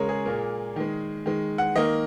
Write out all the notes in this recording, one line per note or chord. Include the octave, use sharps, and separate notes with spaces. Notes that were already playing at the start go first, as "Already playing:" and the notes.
Already playing: C#3 G#3 A#4 C#5
G#4
A#2 A#3
D#3 G#3
D#3 G#3
F#5
D#3 A#3 D#5